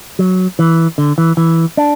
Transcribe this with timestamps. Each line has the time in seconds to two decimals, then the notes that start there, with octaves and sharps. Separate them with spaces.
0.19 F#3
0.59 E3
0.98 D3
1.18 E3
1.37 E3
1.77 D4